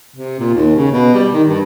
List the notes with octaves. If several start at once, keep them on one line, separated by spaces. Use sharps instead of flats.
C3
A#2
D#2
C#3
B2
G3
D#3
G2